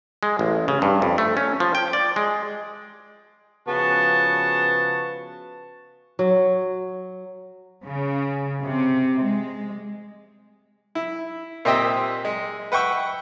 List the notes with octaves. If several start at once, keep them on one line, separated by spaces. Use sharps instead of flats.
G#3
A1
C#3
G2
F2
A3
C#4
F3
G5
D5
G#3
C#3 F3 B3 F#4 A5
F#3
C#3
C3
G#3
E4
A#2 C4 G4 D#5 E5 E6
G#3
B4 F#5 G5 C#6 E6